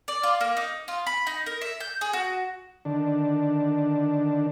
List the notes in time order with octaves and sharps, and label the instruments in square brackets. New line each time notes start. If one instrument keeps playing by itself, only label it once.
[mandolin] D5
F4
A#3
D#4
F4
B5
D#4
A#4
E5
G6
G#4
F#4
[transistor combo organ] D3 D#3 D4